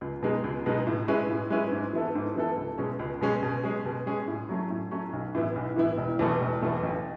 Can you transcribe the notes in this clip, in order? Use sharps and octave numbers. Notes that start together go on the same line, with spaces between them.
C#2
B2 G#3 B3 D#4
C#2
B2 G#3 B3 D#4
A2
G#3 C#4 E4 B4
A2
G#3 C#4 E4 B4
G#2
E3 B3 E4 A4
G#2
E3 B3 E4 A4
C#2
B2 G#3 C#4
C#2
B2 G#3 C#4
B2
G#3 C#4 G#4
B2
G#3 C#4 G#4
A2
F#3 A3 C#4
A2
F#3 A3 C#4
B1
A2 E3 B3 E4
B1
A2 E3 B3 E4
E1
E2 B2 A3
E1
E2 B2 A3
A1